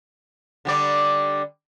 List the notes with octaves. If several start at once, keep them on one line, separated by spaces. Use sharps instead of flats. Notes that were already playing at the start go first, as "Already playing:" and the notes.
D3 G3 D5